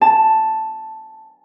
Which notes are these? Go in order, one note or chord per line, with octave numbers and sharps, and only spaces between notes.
A5